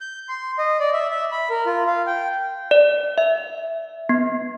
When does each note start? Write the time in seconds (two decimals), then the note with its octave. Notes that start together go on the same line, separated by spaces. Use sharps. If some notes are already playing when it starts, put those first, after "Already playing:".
0.01 G6
0.29 C6
0.59 D#5
0.80 D5
0.93 E5
1.11 E5
1.32 B5
1.50 A#4
1.66 F4
1.87 F5
2.07 G5
2.71 D5
3.18 E5
4.09 B3